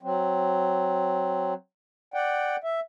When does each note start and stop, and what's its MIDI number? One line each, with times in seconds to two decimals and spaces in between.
0.03 1.54 54
0.03 1.54 60
2.14 2.56 74
2.14 2.56 78
2.14 2.56 79
2.64 2.80 76